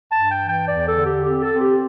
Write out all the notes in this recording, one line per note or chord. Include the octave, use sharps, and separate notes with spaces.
G2 A5
G5
E3
G5
E2 D5
A4
D3
G4
C4 G4
A4
C4
G4